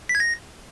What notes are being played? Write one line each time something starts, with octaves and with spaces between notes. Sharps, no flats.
B6
G#6
A#6